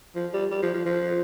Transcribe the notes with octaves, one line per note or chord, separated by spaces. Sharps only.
F3
G3
G3
F3
F3
F3